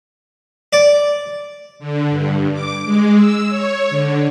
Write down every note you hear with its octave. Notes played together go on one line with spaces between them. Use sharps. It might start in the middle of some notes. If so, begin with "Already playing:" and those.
D5
D3
G2
D6
G#3
E6
C#5
D3